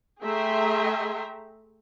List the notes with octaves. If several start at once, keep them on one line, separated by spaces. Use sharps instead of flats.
A3 G#4 E5 G5 A#5 C6